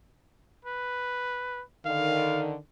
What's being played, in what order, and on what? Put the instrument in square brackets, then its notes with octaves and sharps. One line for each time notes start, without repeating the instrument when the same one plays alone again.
[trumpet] B4
[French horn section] D3 D#3 [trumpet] F5